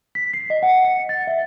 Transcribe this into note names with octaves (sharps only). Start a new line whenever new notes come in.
B6
C7
D#5
F#5
C#7
A6
E5